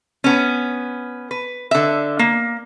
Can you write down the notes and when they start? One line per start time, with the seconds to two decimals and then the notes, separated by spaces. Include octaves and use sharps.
0.24 B3 C#4
1.31 B4
1.71 D3 E5
2.19 A#3